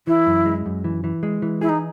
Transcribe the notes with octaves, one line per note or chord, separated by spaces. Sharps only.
E3 E4
F#2
G#3
F#2
E3
E3
G#3
E3
E4 G#4
D#4